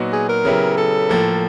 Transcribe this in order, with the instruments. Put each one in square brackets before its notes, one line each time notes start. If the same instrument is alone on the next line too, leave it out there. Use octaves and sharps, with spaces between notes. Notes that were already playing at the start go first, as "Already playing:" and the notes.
Already playing: [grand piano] A#2 F#3 B3 D#4 F#4
[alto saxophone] G#4
A#4
[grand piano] C#3 F#3 B3 E4 G4
[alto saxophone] A4
[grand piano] A2 F3 A#3